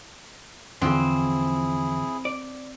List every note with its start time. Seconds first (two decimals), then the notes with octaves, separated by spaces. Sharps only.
0.82 E2 D3 E3 F3 C4 D4 E4 G#4
2.25 D5